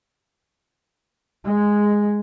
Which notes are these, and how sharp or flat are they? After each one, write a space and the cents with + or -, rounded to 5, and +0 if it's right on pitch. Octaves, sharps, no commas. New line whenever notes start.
G#3 -5